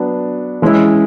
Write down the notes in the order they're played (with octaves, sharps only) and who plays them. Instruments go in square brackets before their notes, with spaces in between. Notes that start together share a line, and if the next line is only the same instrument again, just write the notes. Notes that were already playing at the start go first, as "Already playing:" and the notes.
Already playing: [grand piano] F#3 B3 D4
E3 G#3 C#4 E4